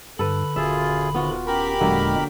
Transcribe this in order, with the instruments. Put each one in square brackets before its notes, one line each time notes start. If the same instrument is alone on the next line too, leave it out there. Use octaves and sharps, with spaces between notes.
[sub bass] G2 [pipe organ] D3 B5 [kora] A4 B4
[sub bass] D#1 [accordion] F#2 F4 G#4 [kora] E5
[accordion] C3 D#3 [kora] B3 F4 F#4
[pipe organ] C#4 [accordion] G4 A#4 B5
[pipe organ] E2 A#2 G#3 [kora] D3 F#3 A#3